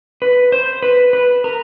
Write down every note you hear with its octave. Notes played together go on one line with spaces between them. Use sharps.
B4
C5
B4
B4
A#4